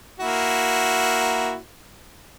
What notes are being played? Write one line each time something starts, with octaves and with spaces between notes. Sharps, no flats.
A#3 E4 F#4